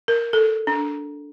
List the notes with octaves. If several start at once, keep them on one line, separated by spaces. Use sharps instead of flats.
A#4
A4
D4